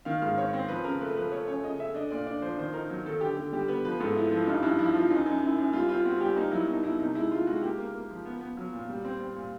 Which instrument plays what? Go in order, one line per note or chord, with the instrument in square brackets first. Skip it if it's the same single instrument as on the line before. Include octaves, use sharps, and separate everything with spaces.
[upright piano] D#3 F5
G#2 F5
C4 C#5
C4 C5
F3 B4
C#3 A#4
A3 B4
F3 B4
A3 C#5
F#2 C#5
C#3 D#5
A3 E5
D4 D#5
A#2 D5
D4 D5
F3 C5
D#3 C5
D#4 A#4
F#3
D#3 A4
D3 G4
D3 G4
G3 G4
B3 B4
F3 B4
G#2 A4
A3 E4
F3 E4
G2 D#4
G2 E4
F3 E4
F3 F4
F#2 D#4
F#2 D#4
F#2 E4
F#2
G3 F4
C4 F4
C4 F#4
G3 G4
A#3 D#4
F#3 E4
B2 D#4
B2 E4
C3 D#4
G#3 E4
G#3 F4
G#3 F#4
A#3 G4
A#3
A#3
F3
B3
B3
F#3
A#2
G3
C4
C4
A#2